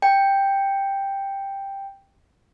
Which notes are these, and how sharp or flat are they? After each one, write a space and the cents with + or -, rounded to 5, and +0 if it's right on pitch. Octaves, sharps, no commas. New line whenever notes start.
G5 +5